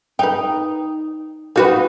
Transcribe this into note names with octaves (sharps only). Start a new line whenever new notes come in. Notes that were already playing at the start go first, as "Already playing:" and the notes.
D#4 B4 G5
A#3 D#4 F#4 B4